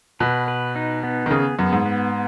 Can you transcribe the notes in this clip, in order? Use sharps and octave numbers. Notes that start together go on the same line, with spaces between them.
B2 B4
B4
D#4
B3
D#3
C#3 G#4
F#2 B3
G#2
B3